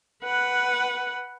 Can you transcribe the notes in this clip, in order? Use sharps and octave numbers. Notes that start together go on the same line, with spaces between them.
B4 F#5